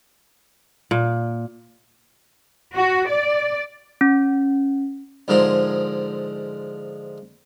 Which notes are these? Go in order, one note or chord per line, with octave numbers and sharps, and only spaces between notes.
A#2
F#4
D5
C#4
G#2 D3 F3 G#3 A#4 C6